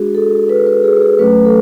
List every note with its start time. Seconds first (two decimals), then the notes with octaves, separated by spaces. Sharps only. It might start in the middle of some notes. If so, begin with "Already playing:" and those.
Already playing: G#3 D4 F#4 G#4
0.15 A4
0.49 B4
0.66 B4
0.84 G#4
1.02 G#4
1.19 F#3 A3 C#4 B4
1.45 A4